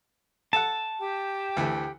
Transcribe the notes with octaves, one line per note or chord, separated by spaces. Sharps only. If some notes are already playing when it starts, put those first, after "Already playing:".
A4 F#5 A5
G4 G5
D2 E3 A3